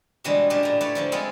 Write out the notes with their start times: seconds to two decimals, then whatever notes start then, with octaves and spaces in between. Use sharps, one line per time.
0.24 B2 D3 E3 G3 G#3 F#4
0.50 F#2 A#2 D4 G4
0.63 A2 A#5
0.81 A3 B4 C#5 D5
0.95 D3 F3 F#3
1.12 G#3 B3 C4 F4 G#4 A4